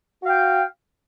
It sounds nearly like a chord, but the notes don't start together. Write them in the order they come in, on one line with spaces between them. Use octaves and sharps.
F#4 F5 G5